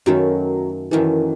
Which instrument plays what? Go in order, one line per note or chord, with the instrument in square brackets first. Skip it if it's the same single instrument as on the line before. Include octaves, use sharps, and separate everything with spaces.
[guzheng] F#2 D#3 A3 [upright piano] F#3
[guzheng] F#2 D#3 A3 [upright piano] E3